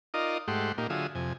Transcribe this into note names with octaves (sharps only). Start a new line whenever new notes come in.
D#4 F4 A#4 D5 D#5
G#2 A3 G4 F#5 C6
A#2 A#3 D#4 G4
D3 F#3 F4 G#4 E5 D#6
F2 C3 G#5